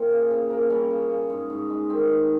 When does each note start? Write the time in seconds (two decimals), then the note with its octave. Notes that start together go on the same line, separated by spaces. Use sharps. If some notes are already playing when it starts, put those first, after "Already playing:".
Already playing: A#2 A#3 C4 G4
0.10 C#3
0.31 C#3
0.50 A#3
0.70 G3 C#4
0.90 C#3
1.10 C#3
1.30 G#2
1.50 G#2
1.70 G#3
1.89 D#3 C4
2.09 G#2